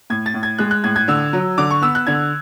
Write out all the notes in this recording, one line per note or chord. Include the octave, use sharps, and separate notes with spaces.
A2 G#6
A6
A2
G#6
G#3 F#6
F#6
A2 G#6
G#6
D3 E6
F#3
D3 D6
C#6
B3 E6
F#6
D3 G#6